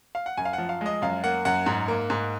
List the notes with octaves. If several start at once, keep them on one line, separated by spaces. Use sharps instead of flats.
F5
F#5
F#2 G#5
F5
F3 F#5
F5
G#3 D#5
F#2 F5
A#3 F#5
F#2 F#5
G#2
A#3
G#2